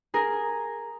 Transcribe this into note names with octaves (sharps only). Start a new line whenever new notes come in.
G#4 A#4